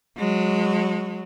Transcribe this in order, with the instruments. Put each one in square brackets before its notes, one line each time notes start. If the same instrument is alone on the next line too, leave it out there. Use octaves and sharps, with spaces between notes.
[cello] F#3 G#3